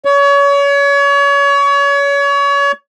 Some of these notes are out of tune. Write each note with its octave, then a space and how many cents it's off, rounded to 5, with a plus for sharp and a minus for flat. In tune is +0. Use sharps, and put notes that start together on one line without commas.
C#5 +30